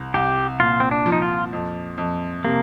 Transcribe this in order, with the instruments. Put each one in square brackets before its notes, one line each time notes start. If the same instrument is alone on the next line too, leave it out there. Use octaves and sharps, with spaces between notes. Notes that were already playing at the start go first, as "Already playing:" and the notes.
Already playing: [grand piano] C2
[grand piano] C2 [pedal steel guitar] G4
[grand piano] A#2 [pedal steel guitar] F4
[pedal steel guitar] C4
D4
[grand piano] F3
[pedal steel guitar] D#4
F4
[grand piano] F2
F2
[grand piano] C3 [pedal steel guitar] A#3